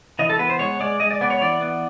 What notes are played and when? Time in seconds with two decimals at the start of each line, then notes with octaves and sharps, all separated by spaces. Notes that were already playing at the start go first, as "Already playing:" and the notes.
0.19 E3 D#5
0.30 A4
0.39 B3 B4
0.50 C5
0.59 G#3 C#5
0.80 G#3 D5
1.00 G#3 D#5
1.10 D5
1.21 B3 D5
1.30 C#5
1.42 E3 D5
1.61 B3